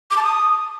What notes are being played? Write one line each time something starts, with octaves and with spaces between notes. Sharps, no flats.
D6
A5
D#6